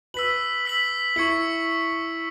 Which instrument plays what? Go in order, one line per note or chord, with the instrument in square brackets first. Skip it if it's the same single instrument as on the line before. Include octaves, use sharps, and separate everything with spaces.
[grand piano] B4 [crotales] E6 B6 F#7
[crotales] E6 B6 F#7
[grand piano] E4 [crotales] C#6 G#6 C#7 F#7